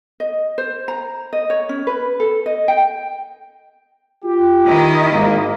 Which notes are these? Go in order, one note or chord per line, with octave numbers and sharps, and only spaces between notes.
D#5
C5
A#5
D#5
C#5
C#4
B4
A4
D#5
G5
F4 G4
D#3 E4 D#5
G#1 A#3